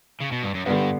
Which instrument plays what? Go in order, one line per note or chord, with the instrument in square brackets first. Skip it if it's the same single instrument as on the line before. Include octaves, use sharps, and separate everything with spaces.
[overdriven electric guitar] C#3
B2
G2
F#2
[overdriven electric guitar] G2 [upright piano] D3 G3 B3